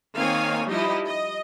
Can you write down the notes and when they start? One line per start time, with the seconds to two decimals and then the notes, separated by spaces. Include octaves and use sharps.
0.17 D#3 A#3 C4 C#5 F5 G#5
0.68 F3 G3 D#4 E4 G4 D#5
1.06 D#5